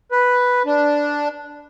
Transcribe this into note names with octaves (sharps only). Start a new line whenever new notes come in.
B4
D4